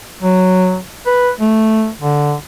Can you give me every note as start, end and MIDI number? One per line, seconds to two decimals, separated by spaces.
0.22 0.78 54
1.07 1.30 71
1.40 1.90 57
2.00 2.34 50